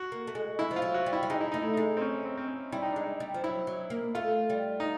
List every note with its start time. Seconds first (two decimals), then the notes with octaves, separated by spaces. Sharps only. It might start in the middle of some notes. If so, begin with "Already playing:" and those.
Already playing: F#4
0.12 A#3
0.27 A3
0.35 G#3
0.59 G#3 E4
0.71 F3
0.76 F4
0.82 F#3
0.94 F#4
1.06 G3
1.13 E4
1.23 G3
1.30 G#3 D#4
1.41 E4
1.52 A3 D#4
1.62 E4
1.73 G#3 D#4
1.97 C4
2.02 C#4
2.25 C4
2.37 C4
2.48 C#4
2.72 G3 E4
2.82 D#4
2.92 G#3 D4
3.03 D#4
3.20 G3
3.34 F3
3.44 F#3 E4
3.67 F#3
3.90 A#3
4.15 A3 F4
4.50 G3
4.80 D#4